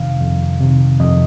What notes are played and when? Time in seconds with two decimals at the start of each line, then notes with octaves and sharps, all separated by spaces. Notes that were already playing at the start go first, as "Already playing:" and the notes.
Already playing: F2 C3 D#3 F5
0.21 F2
0.61 C3 D#3
1.00 F2 D#5